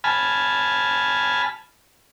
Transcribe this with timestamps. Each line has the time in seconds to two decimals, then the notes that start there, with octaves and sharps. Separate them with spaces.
0.04 G#5 A5 B5 F6